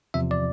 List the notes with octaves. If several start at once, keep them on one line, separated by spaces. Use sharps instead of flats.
E2 C3 F3 E5
D5